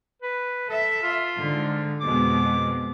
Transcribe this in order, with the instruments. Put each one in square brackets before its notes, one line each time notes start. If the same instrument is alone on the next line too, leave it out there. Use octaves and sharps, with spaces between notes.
[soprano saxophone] B4
[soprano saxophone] A4 [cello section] E5
[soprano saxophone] F4
[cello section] G#2 D3
[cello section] F2 B2 G#3 [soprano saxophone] D6